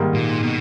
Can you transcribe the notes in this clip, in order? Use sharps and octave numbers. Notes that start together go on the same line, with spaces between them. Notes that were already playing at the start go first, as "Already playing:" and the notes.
Already playing: G#2 D#3 G3 A#3
A#2
B2